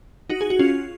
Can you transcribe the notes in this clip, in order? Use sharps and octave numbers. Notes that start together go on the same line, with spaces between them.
D#4 F#4
G#4
F#4
C#4 F4